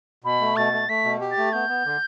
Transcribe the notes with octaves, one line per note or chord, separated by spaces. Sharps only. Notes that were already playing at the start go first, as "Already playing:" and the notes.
B2 B5
A3
B2 A6
A3
A3 B6
B2
G4
A6
A3
B3 G6
B3
D3